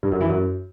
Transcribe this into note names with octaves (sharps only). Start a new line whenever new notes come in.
G2
F#2
E3
F#2